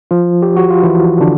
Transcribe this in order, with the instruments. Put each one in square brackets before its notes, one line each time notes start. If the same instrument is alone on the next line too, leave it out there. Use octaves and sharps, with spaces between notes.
[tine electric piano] F3 F4
G4
F#4
F4
E3 E4
D3 D4